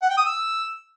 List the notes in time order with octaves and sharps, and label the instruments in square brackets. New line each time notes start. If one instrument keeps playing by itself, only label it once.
[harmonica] F#5
G5
D#6
E6